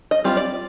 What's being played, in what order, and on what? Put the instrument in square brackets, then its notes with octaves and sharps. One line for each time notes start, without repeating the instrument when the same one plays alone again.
[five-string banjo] D#5
G3 C4 F4
D5